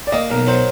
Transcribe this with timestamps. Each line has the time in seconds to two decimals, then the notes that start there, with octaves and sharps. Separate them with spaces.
0.07 D5
0.12 A#3 D#5
0.30 B1 A#4
0.47 F#3 C5